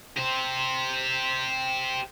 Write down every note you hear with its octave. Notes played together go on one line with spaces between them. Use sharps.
G4 C5